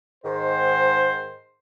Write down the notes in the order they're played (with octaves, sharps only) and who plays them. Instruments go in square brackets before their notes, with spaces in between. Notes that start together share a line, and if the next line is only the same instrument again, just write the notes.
[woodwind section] G#2 D#3 [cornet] C5